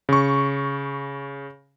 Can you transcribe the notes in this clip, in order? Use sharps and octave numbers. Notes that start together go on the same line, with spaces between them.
C#3 C#6